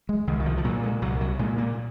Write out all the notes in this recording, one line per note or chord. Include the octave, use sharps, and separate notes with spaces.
G#3
C2 D#3
D#3
F3
F3
A#2 F#3
G#3
C2 F#3
F#3
A#2 G#3
A#3